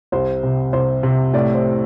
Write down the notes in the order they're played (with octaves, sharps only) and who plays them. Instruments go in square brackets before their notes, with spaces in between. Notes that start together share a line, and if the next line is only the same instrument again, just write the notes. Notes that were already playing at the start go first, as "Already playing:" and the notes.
[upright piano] C2 C5
C3
C2 C5
C3
A2 D5
C5